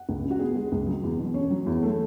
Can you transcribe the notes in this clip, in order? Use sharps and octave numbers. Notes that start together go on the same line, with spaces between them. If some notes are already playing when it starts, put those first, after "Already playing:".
Already playing: F#5
C#2
C#3
F#4
B3 G#4
G#3
C#2
F#3
E2
B2
C#4 C#5
F#3
E2
A3